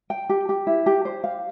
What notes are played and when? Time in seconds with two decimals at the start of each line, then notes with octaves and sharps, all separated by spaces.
0.10 G5
0.29 G4
0.49 G4
0.67 E4
0.86 G4
1.05 C5
1.24 F5